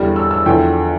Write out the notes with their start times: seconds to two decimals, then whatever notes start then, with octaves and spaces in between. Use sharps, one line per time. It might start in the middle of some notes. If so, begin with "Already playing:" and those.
Already playing: E2 D3 G3 F6
0.16 E6
0.31 E6
0.46 E2 D3 F3 G5